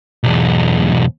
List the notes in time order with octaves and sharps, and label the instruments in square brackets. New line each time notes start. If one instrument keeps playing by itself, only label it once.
[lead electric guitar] B1 E2